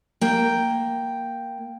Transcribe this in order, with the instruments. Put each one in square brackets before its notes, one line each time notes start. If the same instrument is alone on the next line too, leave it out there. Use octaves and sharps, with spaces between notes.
[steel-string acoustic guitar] A#3 G5